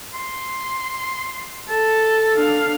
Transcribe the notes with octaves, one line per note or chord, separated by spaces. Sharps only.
C6
A4 A5
D4 F5